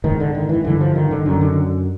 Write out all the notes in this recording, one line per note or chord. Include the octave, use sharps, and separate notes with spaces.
G#2 D#3
D3
D#3
E3
G2 D3 E3
F3
D#3
D3
F#2 D3 D#3
D3